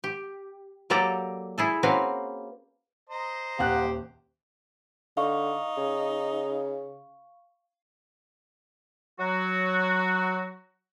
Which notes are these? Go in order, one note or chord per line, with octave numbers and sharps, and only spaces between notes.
G4
F#3 A#3 G4 A4 D5 A#5
E4 G#4 A4
A#3 C4 C#4 F#4 B4 F5
C5 D#5 A#5
D#1 G4 F5 F#5 F#6
D3 D#4 F5 C#6
C#3
F#3 F#4